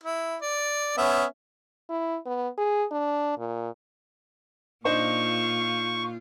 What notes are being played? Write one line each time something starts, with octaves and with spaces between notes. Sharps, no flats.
E4
D5
B3 C#4 E5
E4
B3
G#4
D4
A#2
A#2 D4 D#4 F4 C5 C#6